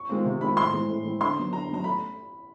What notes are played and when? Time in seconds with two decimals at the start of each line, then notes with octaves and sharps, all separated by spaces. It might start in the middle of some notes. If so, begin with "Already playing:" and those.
Already playing: C#6
0.09 D#3 G#3 C4 F4
0.25 C3
0.41 D#3 G#3 C4 F4 B5
0.56 A2 C6
0.73 E3 G#3 C4
0.89 A2
1.04 E3 G#3 C4
1.20 D3 C6
1.37 F#3 B3 D#4
1.53 D3 A#5
1.69 F#3 B3 D#4 A#5
1.84 A3 B5